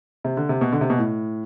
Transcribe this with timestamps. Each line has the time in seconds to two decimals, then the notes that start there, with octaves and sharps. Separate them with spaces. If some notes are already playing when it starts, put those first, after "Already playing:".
0.25 C3
0.37 D3
0.49 C3
0.61 B2
0.72 D3
0.81 C3
0.90 B2
0.98 A2